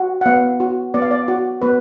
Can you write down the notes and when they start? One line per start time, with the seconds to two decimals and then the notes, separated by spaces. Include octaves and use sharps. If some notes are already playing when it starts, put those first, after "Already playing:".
Already playing: F#4
0.21 F#5
0.26 B3 F5
0.60 F#4
0.94 B3 D5
1.02 F5
1.11 D5
1.28 F#4
1.62 B3 B4